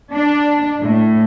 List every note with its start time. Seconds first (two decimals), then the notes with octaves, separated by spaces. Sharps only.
0.12 D4
0.83 A2